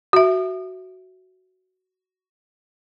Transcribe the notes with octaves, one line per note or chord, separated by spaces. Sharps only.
F#4 E5